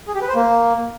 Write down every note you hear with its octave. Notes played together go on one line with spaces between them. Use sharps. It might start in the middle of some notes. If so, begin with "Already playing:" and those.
G#4
G4
B4
C5
A#3